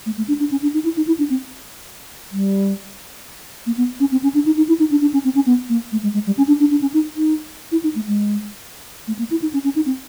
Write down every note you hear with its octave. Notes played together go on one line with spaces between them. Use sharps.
A3
A3
D4
D4
C#4
D4
D#4
E4
D#4
E4
D4
C4
G3
A#3
B3
C#4
C4
C#4
D4
D#4
D#4
E4
D#4
D4
D4
C#4
C4
C#4
B3
A#3
A3
G#3
G#3
G3
C#4
D4
D4
D4
C#4
D#4
D#4
E4
D#4
A3
G#3
A3
A#3
E4
D#4
C#4
C#4
D#4
C4